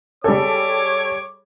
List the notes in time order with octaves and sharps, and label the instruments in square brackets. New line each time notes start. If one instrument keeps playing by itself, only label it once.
[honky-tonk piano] G3 G#4 A4 [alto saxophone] C#5 [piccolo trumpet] D6